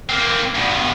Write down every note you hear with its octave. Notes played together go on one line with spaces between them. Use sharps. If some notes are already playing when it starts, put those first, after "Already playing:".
A#3 C4
G2 B2